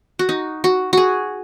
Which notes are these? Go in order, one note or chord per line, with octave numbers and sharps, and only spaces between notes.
F#4
D#4
F#4
F#4 G#4